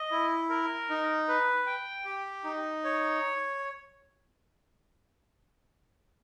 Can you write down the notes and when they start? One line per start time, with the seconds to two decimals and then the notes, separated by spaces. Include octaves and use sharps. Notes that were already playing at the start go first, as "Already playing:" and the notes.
Already playing: D#5
0.11 E4
0.49 A#4
0.89 D#4
1.28 B4
1.66 G5
2.05 G4
2.44 D#4
2.84 C#5